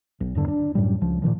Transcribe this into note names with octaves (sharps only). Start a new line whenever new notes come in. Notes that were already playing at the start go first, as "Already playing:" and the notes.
B1
E2 G2 D3
D4
F#2 A2 G3
C#2 F3
A#2 D3 D#3 F3